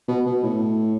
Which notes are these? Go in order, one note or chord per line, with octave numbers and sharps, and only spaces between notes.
B2
B2
A2